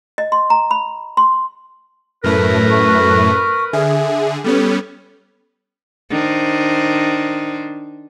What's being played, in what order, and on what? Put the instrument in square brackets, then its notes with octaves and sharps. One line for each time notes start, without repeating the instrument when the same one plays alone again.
[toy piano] D#5
C6
A#5
B5
C6
[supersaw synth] F#2 A2 A3 [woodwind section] A#4 B4
[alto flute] C#6
[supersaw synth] D3 G#4 [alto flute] E5
[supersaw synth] G3 B3 C#4 [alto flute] A4
[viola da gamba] D#3 D4 C5